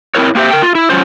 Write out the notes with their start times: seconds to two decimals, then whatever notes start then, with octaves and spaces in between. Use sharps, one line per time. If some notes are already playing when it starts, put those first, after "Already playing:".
0.15 C4 E4 A#4 C#5
0.35 A#3 C4 G4 C5 E5
0.51 A#4 G5
0.62 F4
0.75 E4
0.90 F#3 C#4 F4 C5